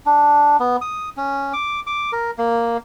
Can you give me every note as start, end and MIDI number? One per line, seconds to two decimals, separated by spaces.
0.06 0.57 62
0.60 0.76 59
0.81 1.09 87
1.17 1.53 61
1.53 1.80 86
1.87 2.12 86
2.12 2.31 70
2.38 2.77 58